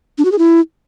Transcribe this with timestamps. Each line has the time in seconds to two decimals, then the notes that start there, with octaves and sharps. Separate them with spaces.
0.18 D4
0.25 F#4
0.32 G#4
0.38 E4